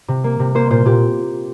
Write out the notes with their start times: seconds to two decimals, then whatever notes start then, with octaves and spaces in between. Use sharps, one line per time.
0.08 C3
0.24 A#3
0.39 C3
0.55 A#3 C5
0.70 A#2 C5
0.85 A#2 G4